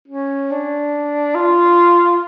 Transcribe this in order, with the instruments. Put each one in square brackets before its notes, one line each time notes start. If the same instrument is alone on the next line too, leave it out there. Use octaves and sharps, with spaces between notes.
[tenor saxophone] C#4
D4
F4